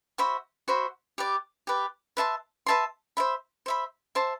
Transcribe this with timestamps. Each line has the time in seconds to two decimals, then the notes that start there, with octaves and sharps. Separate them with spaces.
0.18 F#4 C5 E5 B5
0.68 F#4 C5 E5 B5
1.18 G4 B4 D5
1.67 G4 B4 D5
2.17 B4 E5 A5 C6
2.66 B4 E5 A5 C6
3.17 C5 E5 B5
3.66 C5 E5 B5
4.15 C5 E5 A5 C6